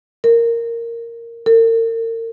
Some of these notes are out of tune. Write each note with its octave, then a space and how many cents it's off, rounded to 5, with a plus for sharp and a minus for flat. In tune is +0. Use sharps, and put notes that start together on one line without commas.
A#4 -5
A#4 -40